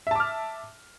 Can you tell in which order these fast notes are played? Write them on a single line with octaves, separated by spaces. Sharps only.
E5 A5 D6 F6